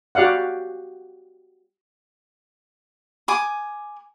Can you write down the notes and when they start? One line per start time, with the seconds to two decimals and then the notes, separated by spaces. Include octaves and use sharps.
0.15 F#4 G4 D5 F5 F#5
3.28 G#5 D6 D#6